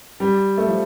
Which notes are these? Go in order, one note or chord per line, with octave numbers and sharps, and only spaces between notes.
G3
A3
F3